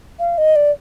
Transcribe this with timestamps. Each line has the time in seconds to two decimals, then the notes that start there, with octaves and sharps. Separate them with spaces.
0.19 F5
0.38 D#5
0.56 D5